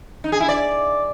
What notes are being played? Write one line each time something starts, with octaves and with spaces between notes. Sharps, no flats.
D#4
G#4
E4
D5